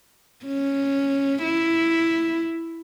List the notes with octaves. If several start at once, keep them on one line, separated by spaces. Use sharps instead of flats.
C#4
E4